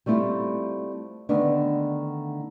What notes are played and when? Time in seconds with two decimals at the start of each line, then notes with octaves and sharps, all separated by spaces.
0.06 G3 A3 C4 E4 F4
1.29 D3 D#3 A3 B3 D4